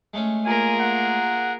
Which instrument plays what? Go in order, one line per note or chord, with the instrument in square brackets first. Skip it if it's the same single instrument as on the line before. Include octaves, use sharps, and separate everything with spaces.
[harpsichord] G#3 A3 C#4
[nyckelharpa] A#3 F4 [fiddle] G#4 A#4 [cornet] G#5
[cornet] F#5